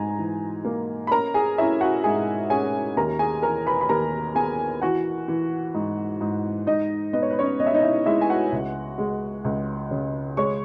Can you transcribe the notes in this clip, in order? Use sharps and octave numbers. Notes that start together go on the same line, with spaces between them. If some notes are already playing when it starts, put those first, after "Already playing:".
Already playing: G#2 G#5 A#5
E3
A#3
B5
C#4 A#4 A#5
G#4 G#5
C#4 E4 E5
F#4 F#5
G#2 G#4 G#5
C#4 G#4 G#5
D#2 A#4 A#5
G#4 G#5
E3 A#4 A#5
B4 B5
B5
D#2 A#4 A#5
B3 G#4 G#5
E3 F#4 F#5
E3
G#2
G#2
G#2 D#4 D#5
B3 D#5
C#5
B4
C#4 C#5
B3 D#5
E5
D#4 D#5
E4 E5
G#3 E4 E5
G#5
F#4 F#5
C#2
G#3
C#2
C#3
G#3 C#5 C#6